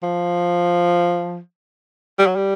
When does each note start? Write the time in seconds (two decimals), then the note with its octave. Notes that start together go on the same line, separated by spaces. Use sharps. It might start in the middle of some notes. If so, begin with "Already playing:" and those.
0.03 F3
2.19 G3
2.27 F#3
2.36 G3